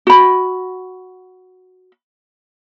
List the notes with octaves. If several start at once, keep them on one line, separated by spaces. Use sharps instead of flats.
F#4 B5